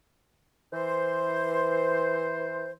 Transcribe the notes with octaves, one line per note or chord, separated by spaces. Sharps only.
E3 C5